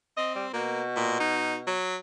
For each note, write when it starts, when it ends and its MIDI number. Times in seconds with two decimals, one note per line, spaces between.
0.17 0.53 60
0.17 0.31 75
0.35 0.46 55
0.53 1.77 47
0.53 0.82 58
0.96 1.19 46
1.20 1.57 63
1.67 1.97 54